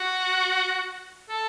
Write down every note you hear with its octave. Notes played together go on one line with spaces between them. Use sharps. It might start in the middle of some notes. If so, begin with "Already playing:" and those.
Already playing: F#4
A4